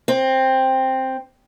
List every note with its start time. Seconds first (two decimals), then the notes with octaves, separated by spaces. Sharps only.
0.08 C4